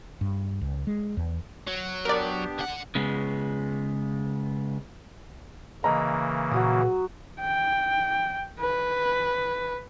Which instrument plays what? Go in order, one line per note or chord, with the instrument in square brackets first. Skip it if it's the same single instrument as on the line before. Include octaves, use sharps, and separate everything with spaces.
[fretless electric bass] G2
C#2
G#3
E2
[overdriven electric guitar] F#3
[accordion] B3 D4 G4 [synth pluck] A#4 D5
[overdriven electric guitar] D3 F#5
[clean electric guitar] C#3 G#3 B3
[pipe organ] C#3 E3 A#3 [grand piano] D#5 A#5 [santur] B5
[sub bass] A#2 [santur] F#3 F#4 D#6
[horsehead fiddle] G5
B4